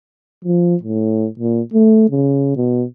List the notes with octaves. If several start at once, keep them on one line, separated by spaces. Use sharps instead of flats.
F3
A2
A#2
A3
C#3
B2